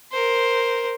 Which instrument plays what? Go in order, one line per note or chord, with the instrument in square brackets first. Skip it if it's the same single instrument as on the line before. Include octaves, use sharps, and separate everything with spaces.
[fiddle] A#4 C5